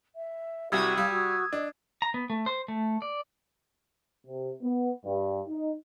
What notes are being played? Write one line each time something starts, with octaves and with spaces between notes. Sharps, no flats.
E5
C2 C3 G3 F#4 D#6 E6 G#6
G3 F5
F#4
D4 D#5
A#5
B3
A3
C5
A3
D5
C3
B3
G2
D#4